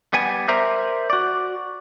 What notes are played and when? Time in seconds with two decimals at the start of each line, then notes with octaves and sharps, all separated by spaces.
0.13 G3 B3 G#5
0.48 A#4 C5 D5 E5 A#5
1.10 F#4 D5